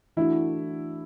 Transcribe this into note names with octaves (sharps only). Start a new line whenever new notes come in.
E3 A3 D4 E4 F#4